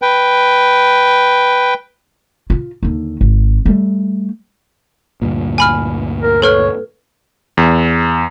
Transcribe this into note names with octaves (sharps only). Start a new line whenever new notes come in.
B4 G5
F4
D#2 D3
G#1
G3 A3
D2 G2 A#2
G#5 B5 F6
A#4
A4 B4 C#5 F6
E2